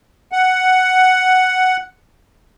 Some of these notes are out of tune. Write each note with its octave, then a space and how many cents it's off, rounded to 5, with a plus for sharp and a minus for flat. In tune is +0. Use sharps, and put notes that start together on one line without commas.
F#5 +5